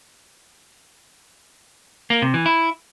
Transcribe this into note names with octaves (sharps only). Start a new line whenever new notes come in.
A#3
C3
E3
E4